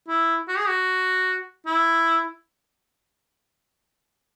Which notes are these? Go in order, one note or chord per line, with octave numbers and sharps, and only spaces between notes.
E4
F#4
G#4
F#4
E4